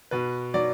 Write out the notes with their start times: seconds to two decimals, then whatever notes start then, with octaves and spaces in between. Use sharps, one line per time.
0.11 B2 B4
0.54 F#3 D5